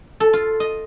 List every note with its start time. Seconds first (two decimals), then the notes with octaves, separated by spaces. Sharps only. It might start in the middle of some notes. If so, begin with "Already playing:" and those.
0.20 A4
0.33 F4
0.60 D#5